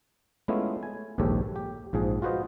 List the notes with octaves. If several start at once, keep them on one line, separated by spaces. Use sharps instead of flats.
G#3 A3 B3 C#4 E4 F4
G#5
A#1 D#2 G#2 G4 A4 C#5
G4
A#1 G#2 F3 G#4
F4 F#4 B4 C5 D#5